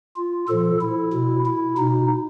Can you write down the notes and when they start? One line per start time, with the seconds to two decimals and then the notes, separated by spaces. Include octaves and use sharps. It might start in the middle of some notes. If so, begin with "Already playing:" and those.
0.16 F4
0.48 A#2 F3 A4
0.81 E4
1.13 B2
1.46 E4
1.77 B2 D#4